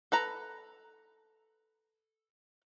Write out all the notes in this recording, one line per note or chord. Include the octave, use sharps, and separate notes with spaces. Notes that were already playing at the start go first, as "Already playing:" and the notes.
A4 B4 A#5